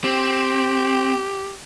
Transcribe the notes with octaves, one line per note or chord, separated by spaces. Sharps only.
C4 G4